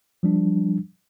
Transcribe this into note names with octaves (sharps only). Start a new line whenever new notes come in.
F3 G3 D4